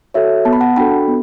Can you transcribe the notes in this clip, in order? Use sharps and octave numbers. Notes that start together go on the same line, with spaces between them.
F#4 A4 C#5 E5
B3 A5
B5
F#5 A5
D4 F#4 A4 G5 B5
B3